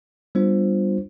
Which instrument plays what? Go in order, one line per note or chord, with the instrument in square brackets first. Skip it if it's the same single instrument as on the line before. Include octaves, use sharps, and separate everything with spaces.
[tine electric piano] G3 B3 D4 F4 C5